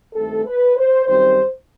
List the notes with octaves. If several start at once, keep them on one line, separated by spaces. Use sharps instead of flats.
G2 D#3 A3 C4 A4
B4
C5
F#2 D#3 G3 C4 C5